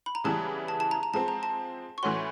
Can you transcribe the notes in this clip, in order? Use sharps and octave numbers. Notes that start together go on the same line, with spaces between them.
B5
A#5
C#3 E3 G3 B3 E4 A5
A5
A5
A#5
A#5
F3 G#3 C4 A5
A#5
A5
C#6
A2 E3 A3 C#4 F#4 C6